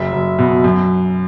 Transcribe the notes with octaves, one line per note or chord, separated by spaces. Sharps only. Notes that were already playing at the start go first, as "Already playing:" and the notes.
Already playing: F#1 E5
F#1
B2
F#2